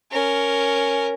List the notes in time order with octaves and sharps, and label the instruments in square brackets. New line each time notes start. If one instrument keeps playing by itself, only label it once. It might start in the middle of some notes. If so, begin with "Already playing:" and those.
[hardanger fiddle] C#4 A#4